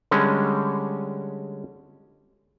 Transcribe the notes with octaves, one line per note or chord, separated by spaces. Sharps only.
D3 G3 G#3 C#4